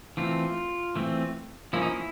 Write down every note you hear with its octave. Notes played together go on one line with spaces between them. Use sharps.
E3 A3 C4 F4
E3 A3 C4
F3 A#3 C#4 E4
D#4
E4